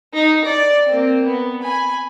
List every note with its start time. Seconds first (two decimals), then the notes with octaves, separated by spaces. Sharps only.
0.14 D#4
0.45 D5
0.86 A#3 C4
1.25 B3
1.63 G#5 B5